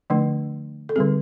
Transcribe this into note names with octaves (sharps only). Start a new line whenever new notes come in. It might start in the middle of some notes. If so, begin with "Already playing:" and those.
D3 F3 A3 D4
A4
D3 G3 C4 G#4